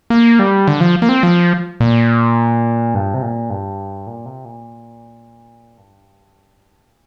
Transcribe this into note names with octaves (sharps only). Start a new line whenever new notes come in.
A#3
G3
D3
F3
A#3
C4
F3
A#2
G2
C3
A#2
G2
A#2
C3
A#2
G2
A#2